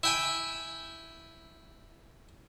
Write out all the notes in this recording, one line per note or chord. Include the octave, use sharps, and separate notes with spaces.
E4 G5 G#5